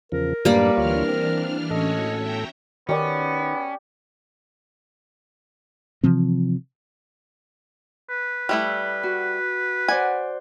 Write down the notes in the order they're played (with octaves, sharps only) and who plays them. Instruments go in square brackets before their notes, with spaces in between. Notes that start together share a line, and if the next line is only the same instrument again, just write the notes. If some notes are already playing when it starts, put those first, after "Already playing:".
[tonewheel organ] E2 C#3 F3 [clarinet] A#4
[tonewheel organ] F#2 A2 D4 [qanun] G3 A#3 D5 [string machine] B4
[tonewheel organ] D2 F4 C#5 [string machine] E3 D4 F6
[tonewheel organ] C4
[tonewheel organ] A2 A4 [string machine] C#4 F#4 C#5 [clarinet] D#5
[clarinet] B3 [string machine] E5 G5 A#5
[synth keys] D#3 [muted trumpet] B3 [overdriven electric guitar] C#4 [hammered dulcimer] G4 D5
[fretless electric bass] C3 E3 F3 C4
[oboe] B4
[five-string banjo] G3 A3 E4
[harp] F#4
[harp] C5 D5 F#5 [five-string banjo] G#5